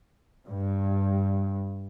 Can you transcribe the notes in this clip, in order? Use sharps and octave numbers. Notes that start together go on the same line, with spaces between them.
G2